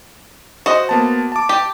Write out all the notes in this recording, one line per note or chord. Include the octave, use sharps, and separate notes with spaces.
F#4 C5 D#5
A#3 B3 A5
A5 D6
G4